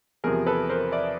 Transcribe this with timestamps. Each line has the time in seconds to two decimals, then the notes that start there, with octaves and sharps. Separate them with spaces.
0.24 E2 C3 F3 G#4 A#4
0.47 A4 B4
0.70 A#4 C5
0.92 D5 E5